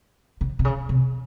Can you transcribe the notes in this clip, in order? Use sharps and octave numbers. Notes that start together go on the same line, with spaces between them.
C#3
C3
C#3
C3